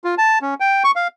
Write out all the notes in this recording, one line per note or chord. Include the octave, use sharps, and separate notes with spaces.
F4
A5
C#4
G5
C#6
F5